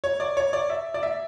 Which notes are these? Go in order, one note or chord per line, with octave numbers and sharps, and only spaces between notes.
C#5
D5
C#5
D5
E5
D5
E5